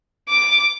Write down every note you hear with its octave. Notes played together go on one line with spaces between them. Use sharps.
D6